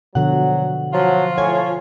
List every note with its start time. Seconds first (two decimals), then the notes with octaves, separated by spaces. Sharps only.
0.15 B2 D3 F3 F#3 F#5
0.93 F3 F#3 F4
1.38 A2 C#5 G#5